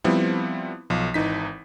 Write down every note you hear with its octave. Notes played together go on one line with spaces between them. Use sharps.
F3 G3 B3 C4 E4
B1 F3
G#1 E3 D#4 B6